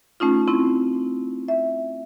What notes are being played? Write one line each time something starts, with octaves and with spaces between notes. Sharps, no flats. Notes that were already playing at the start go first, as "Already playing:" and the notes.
A3 C#4 D#4 F4
C4 C#4 E4
E5